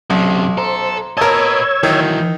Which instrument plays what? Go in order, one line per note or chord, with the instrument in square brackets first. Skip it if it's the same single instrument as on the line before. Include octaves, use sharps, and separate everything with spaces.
[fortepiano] B1 [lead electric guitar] F#2 C3 [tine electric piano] F#3
[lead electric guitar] A4 [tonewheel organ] C5 [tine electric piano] A#5 C6
[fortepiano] A#4 A5 [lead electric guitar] B4 D#5 [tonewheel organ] C#5 E6 G#6
[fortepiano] D#3 [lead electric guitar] E3 F#3 [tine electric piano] G6